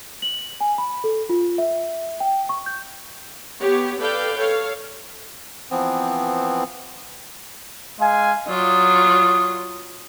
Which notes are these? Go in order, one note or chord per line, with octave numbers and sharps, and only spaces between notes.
F#7
G#5
B5
A4
F4
E5
G5
C#6
G6
B3 G4 C#5
A4 B4 D5 F5 G5
A4 C#5 F5
E3 F3 B3 C4
G#3 F5 G#5
F#3 F4 D5 D#6